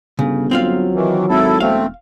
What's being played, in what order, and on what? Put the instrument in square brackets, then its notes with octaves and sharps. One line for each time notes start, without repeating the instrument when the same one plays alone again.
[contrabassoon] G1 [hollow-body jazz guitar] C#3
[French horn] F#3 [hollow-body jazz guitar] C4 F4 F5
[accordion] D#3 E3
[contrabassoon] G#1 [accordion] E4 A4
[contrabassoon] E1 [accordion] A3 C4 [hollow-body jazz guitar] F5